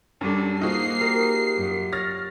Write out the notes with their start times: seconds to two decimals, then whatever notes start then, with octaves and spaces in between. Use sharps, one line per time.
0.21 F#2 G3 C#4 D4 A4
0.61 A#3 D#4 F4 F#4 G#4 C5 C7
1.00 G4 A#4
1.57 F#2
1.93 C#5 F6 A6 A#6